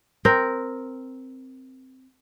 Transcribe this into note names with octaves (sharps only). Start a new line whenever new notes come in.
C4 A#4